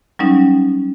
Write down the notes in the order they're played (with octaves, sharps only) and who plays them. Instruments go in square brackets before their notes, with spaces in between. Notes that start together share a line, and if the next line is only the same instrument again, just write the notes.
[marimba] F#3 G3 C#4 D#4